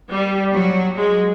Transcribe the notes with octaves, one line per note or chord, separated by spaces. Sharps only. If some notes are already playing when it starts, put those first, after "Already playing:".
G3
F#3
G#3